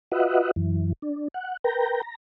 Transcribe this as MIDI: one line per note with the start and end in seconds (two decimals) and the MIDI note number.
0.12 0.51 65
0.12 0.51 66
0.12 0.51 71
0.12 0.51 75
0.12 0.51 76
0.12 0.51 78
0.56 0.93 42
0.56 0.93 52
1.02 1.28 62
1.34 1.57 78
1.64 2.01 70
1.64 2.01 71
1.64 2.01 79
1.64 2.01 82
2.03 2.15 82